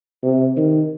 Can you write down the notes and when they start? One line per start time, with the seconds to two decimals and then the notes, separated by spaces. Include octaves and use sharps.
0.23 C3
0.57 D#3